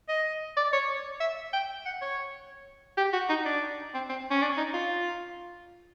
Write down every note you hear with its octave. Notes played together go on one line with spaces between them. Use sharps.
D#5
D5
C#5
E5
G5
F#5
C#5
G4
F#4
D#4
D4
C4
C4
C#4
D4
D#4
F4